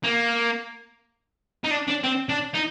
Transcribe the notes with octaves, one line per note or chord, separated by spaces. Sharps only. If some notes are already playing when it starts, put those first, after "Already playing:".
A#3
D#4
D4
D4
C4
D4
D#4